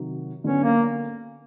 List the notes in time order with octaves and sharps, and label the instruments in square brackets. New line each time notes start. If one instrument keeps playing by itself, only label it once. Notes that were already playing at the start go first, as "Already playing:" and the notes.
Already playing: [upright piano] C3 D#3 F#3
[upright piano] D3 F#3 B3 [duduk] C#4
[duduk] A#3